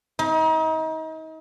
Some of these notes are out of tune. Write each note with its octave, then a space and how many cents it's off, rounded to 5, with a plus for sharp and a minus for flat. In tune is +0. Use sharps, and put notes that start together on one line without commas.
D#4 +35